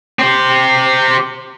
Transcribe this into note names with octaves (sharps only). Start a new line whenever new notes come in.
C4 G4